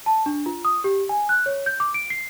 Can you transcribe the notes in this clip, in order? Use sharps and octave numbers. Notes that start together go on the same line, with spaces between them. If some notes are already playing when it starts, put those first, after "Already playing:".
A5
D4
F4
D#6
G4
G#5
F#6
C#5
G6
D6
D7
C7